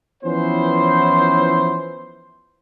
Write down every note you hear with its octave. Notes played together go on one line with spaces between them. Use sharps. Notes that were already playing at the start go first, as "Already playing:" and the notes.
E3 F3 B3 C#4 E4 C5